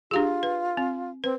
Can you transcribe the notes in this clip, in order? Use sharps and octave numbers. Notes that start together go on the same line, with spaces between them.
D4 F4 G4 G#4
B4
C4
C4 B4